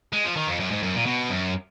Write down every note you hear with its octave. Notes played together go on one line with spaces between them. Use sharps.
G#3
F3
D#3
F2
F#2
G#2
F#2
A#2
B2
F#2